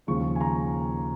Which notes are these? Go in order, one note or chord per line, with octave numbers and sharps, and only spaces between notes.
D#2 C#3 F3 G#3 C#6
G#5
A#5